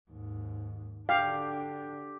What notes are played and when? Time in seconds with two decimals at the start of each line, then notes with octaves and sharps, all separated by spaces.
0.11 D#2 G#2
1.09 D3 D4 G4 F5